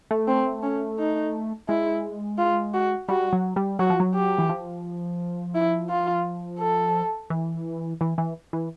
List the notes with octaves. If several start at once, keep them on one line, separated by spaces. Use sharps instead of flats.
A3
C4
C#4
D#4
G#3 E4
F4
F#4
G3 F#4
F#3
G3
F#3 F#4
F3
F#3
G4
E3
F3
E4
F4
A4
E3
E3
E3
E3